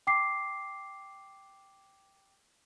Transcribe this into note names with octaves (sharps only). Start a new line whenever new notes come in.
G5 D6 C7